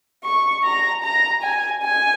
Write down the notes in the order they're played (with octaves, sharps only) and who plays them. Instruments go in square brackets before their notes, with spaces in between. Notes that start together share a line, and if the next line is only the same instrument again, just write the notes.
[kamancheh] C#6
A#5
A#5
G#5
G#5